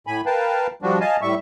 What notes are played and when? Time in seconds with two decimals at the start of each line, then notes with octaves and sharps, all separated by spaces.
0.07 A2 G#5 B5
0.26 A#4 B4 F5 G5 A5
0.82 F3 G3 D4 F#4
1.01 D#5 F5 G#5 A5
1.22 A2 G3 E5 C#6